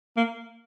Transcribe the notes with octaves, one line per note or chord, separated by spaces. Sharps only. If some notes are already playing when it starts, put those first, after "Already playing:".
A#3